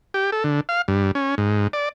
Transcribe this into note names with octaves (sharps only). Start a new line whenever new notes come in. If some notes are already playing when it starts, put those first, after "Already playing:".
G4
A4
D3
F5
G2
C#4
G#2
D5